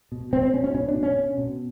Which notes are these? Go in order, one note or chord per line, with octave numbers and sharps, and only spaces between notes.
B2
B2 C4
C4
B2 C#4
C#4
B2 C#4
D4
B2
C#4
B2
B2